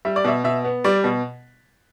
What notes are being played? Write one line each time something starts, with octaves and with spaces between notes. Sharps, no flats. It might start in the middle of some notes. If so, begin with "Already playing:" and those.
G3 E5
D5
B2 E5
B2 E5
B3
G3 D5
B2